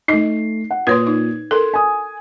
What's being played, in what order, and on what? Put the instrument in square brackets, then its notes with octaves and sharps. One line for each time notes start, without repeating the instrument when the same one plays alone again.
[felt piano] A3 C7 [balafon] D#4 D#5
[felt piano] F#5
[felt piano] A#2 D#6 G#6 [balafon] B4 C#5 C6
[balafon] D#4
[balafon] A4 A#4 [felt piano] C6
[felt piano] G#5 D#6